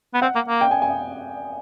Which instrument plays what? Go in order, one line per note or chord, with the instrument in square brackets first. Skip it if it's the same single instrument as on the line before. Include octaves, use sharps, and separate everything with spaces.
[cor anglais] B3
[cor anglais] C4 [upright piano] F#5
[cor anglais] A#3
A#3
[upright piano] G5
G#5
G#5